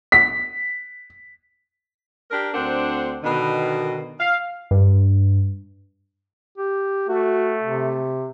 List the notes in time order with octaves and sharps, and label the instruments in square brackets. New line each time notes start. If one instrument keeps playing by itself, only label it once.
[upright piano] B6
[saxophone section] D4 G4 A#4
D2 C4 D4 C5 F#5
B2 D3 D#3
F5
[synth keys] G2
[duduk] G4
[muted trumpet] A3 [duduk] F#4
[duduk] C3